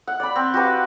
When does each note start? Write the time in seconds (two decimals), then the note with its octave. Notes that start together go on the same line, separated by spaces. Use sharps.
0.07 F#5
0.20 D5 B5
0.36 C4
0.54 F#4 G4 B4 F5